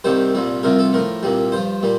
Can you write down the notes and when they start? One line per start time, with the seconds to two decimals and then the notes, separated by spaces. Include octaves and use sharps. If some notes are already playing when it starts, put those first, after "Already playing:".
0.04 C2 C3 D#3 G3 C5
0.35 C2 A#2 G3
0.63 C2 C3 F3 A#4
0.79 A4
0.93 A2 F3 A#4
1.23 C2 A#2 G3
1.52 G2 F3 C5
1.83 A#2 G3